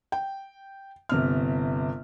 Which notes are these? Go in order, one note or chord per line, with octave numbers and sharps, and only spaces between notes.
G5
G1 C3 F6